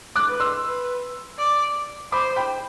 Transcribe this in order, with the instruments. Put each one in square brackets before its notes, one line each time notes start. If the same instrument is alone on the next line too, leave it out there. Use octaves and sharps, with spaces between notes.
[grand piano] D6 F#6
[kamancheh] B4
[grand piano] C6 E6
[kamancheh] B4
D5
[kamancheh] C5 [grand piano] B5 D6
[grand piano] G5 B5